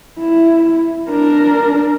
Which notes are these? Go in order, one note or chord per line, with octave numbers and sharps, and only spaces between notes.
E4
D4 A#4